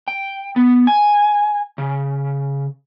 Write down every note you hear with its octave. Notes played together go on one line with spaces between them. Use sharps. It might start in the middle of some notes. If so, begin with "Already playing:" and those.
G5
B3
G#5
C#3